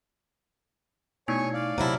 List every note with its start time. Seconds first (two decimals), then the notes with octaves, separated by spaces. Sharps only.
1.28 B2 A3 D#4 E4 C#5 G#5 C#6
1.54 D5 F5
1.78 C3 F#3 E4 F#5 A5 A#5